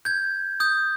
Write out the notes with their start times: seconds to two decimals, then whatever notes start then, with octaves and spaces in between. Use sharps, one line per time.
0.05 G6 G#6
0.60 D#6 G6